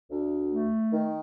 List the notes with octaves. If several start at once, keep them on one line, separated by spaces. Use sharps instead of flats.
D2
A3
D#3